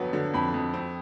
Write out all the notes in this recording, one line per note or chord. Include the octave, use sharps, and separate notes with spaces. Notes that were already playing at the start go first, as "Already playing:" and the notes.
Already playing: F2 D3 F#3 B3
D3
F2 B5
F2
C4